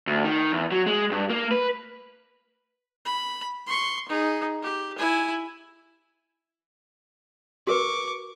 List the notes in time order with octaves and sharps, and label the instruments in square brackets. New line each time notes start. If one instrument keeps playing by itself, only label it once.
[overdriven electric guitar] D2
D#3
E2
F#3
G#3
G2
A#3
B4
[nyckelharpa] B5
C6 C#6
D#4 G#4
G4
E4 G#5
[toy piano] F#4 A#4 B4 [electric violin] C#6 D6